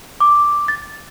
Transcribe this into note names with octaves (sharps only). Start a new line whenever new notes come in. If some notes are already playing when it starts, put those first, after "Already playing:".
D6
A6